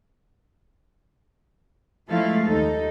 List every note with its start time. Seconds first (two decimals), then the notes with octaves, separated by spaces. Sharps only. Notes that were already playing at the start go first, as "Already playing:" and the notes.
2.09 F3 G#3 A3 E4 A4 F5
2.42 D#2 D#4 A4